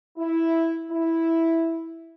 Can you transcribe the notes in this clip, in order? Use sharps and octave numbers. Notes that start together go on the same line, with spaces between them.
E4
E4